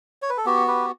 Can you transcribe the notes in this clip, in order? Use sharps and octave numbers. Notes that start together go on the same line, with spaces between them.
C#5
B4
A4
B3 F#4 G4
G4 B4